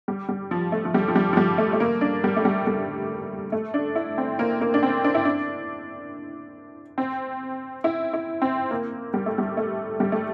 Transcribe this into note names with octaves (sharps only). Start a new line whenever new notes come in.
G3
G3
F3
A3
F3
G3
F3
G3
F3
G3
A3
A3
A#3
D4
G3
A3
G3
G3
A3
D4
E4
C4
A#3
A#3
D4
C4
D4
E4
D4
C4
E4
E4
C4
A#3
G3
A3
G3
A3
G3
A3